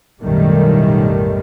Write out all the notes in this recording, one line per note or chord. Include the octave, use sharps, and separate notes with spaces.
B1 F#2 A2 D#3 G3 A3